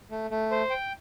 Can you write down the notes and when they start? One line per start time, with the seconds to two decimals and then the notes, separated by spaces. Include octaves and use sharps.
0.11 A3
0.31 A3
0.51 C5
0.70 G5